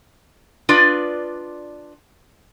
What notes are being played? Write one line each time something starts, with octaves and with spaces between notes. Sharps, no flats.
D4 F4 B4 D5 D#5